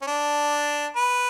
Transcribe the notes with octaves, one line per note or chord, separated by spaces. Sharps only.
C#4
D4
B4